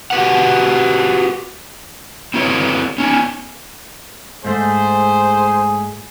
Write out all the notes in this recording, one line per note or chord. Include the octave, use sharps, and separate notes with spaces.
F#4 G4 B4 F#5
C4 E4 F#4 B4 C#5
C#4 D#4 G#5
G#2 A3 G#4 C5